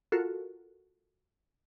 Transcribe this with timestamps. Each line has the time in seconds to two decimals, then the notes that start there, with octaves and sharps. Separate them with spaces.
0.12 F4 F#4 A4 A#4